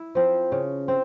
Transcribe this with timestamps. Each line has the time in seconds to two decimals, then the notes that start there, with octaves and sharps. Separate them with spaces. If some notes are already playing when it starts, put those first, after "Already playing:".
Already playing: E4
0.15 F3 C4
0.52 C#3
0.88 C4